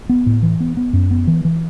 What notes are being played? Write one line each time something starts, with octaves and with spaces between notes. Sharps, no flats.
B3
A2
E3
B3
B3
F#2
B3
E3
E3